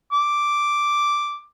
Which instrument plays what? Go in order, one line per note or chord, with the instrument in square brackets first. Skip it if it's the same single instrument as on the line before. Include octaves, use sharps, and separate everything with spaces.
[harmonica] D6